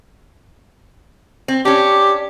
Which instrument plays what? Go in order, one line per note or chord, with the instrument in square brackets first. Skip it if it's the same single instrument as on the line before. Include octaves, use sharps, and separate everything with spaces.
[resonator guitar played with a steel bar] C4
[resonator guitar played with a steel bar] C#4 D4 [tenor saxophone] G4